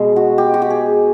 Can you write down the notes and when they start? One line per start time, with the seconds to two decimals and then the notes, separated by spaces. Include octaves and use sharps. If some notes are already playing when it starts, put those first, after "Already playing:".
Already playing: B2 G#3
0.16 F#4
0.38 G4
0.54 F#4
0.62 G4
0.70 G#4